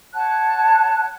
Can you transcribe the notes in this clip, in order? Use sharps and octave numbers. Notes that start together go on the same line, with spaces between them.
C#5 F#5 A5 F#6